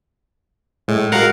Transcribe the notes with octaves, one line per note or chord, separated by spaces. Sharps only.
A2 G#3
G#3 F#4 A#4 F5 F#5